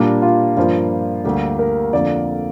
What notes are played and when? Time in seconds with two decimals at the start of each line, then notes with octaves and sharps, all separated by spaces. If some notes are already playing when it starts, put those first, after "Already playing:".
Already playing: A#2 G3 A#3 D4
0.22 F4
0.57 G2 F3 A#3 F4
1.24 D2 D3 G3 A#3 G4
1.59 A#4
1.92 F2 D3 A#3 D5